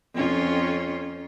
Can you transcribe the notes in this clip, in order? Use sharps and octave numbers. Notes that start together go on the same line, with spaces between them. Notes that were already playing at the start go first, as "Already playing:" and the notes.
F2 C#4 F4